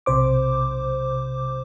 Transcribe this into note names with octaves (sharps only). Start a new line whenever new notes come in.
B1 C3 C5 D6